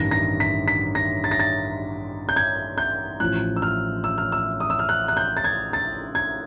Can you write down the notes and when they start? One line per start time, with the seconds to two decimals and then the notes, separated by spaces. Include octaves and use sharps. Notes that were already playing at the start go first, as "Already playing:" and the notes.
Already playing: A1 G2 D#3 A#6
0.11 A#6
0.40 B6
0.68 B6
0.95 A#6
1.24 A6
1.31 A#6
1.40 A6
2.29 G6
2.36 G#6
2.78 G6
3.20 A1 A2 F3 F#6
3.56 E6
3.62 F6
4.04 E6
4.18 F6
4.32 E6
4.60 D#6
4.70 E6
4.79 F6
4.89 F#6
5.08 F#6
5.17 G6
5.37 A6
5.44 G#6
5.73 A6
6.15 G#6